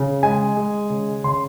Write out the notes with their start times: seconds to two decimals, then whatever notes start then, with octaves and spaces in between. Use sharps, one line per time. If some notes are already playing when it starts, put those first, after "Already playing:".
Already playing: C#3
0.23 G#3 G#5
0.57 G#3
0.90 C#3
1.24 C#3 C6